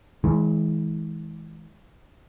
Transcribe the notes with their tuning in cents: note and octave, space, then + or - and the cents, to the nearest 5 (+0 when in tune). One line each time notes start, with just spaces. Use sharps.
E3 -35 G#3 +15